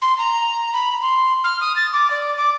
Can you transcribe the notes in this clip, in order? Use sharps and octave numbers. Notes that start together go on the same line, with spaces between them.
C6
A#5
B5
C6
F6
D#6
A6
D6
D5
D6